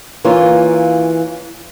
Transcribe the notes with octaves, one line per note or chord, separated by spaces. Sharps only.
E3 A#3 C#4 F4